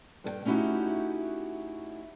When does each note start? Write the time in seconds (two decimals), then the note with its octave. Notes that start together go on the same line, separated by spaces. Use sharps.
0.24 G2 A4 G5
0.45 A3 C#4 D#4 E4 F#4 G4